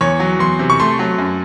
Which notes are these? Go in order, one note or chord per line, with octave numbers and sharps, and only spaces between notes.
E2 C#5
F#3
E2 C6
C3
C#6
A3 C6
F#3
F#2